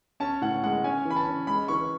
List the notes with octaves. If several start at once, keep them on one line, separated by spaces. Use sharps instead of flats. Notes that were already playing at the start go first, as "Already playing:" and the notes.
C#4 A5
A2 F#5
G#3 F#5
C#4 G#5
E3
B5
A5
C#4
G#3 B5
E3 C#6